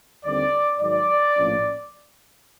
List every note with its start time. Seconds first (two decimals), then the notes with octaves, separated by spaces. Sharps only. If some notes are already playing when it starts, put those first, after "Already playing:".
0.25 D#2 D3 G3 C4 D5
0.79 G#2 D#3 F#3 D5
1.36 A#1 A2 F3 A#3 C#4